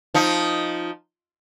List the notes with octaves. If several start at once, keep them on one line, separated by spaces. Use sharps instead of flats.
F3 D#4